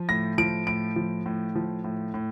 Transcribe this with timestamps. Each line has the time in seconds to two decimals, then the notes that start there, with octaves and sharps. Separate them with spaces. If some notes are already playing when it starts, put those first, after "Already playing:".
Already playing: F3
0.09 A2 A#6
0.38 F3 D7
0.67 A2 D7
0.96 F3
1.26 A2
1.55 F3
1.84 A2
2.14 A2